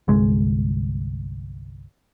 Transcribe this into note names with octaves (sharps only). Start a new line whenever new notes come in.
G1 C2 G#3